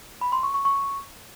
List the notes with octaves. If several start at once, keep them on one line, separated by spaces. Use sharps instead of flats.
B5
C6
C#6
C#6
C#6